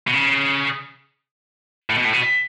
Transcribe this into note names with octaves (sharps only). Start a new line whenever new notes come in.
B2
C#3
A2
B2
A2
B2